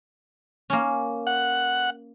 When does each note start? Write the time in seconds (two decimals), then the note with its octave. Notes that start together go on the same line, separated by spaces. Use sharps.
0.70 A#3 C#4
1.27 F#5